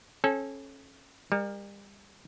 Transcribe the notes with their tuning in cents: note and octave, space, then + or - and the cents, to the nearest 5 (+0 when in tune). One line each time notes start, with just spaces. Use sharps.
C#4 -25 A4 -25
G3 +40 A#4 +0